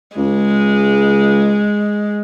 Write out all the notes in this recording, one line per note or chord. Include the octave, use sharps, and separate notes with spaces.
C#2 G#3